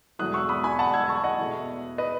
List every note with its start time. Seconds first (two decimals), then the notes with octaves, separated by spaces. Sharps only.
0.19 E1 E2 B2 F#3 A3 D#6 F#6
0.34 C#6 E6
0.49 B5 D#6
0.64 G#5 B5
0.79 F#5 A5
0.94 E6 G#6
1.08 A5 C#6
1.24 D#5 F#5
1.39 E2 B2 A3
1.98 B4 D#5